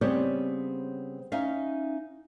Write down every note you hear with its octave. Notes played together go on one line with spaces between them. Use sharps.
C#3 G3 B3 C4 C5 C#5
C#4 D#4 E5 F5